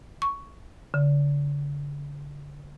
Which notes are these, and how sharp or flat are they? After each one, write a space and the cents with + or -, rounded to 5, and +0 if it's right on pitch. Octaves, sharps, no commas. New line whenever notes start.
C#6 +10
D3 -40